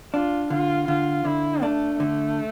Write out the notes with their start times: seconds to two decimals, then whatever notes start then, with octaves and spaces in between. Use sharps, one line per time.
0.13 D4 F4
0.50 D3 F4
0.87 D3 F4
1.25 D3 E4
1.63 A3 D4
2.00 D3 A3